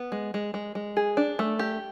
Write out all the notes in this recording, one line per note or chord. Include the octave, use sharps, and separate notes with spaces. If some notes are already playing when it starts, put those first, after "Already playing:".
Already playing: B3
G#3
G#3
G#3
G#3
G#4
D4
A3
G4